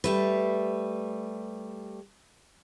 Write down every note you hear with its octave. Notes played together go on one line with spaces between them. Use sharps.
G3 A3 B4